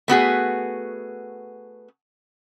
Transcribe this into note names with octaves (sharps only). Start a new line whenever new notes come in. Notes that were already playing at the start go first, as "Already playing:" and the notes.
A3 B3 F#4 G#4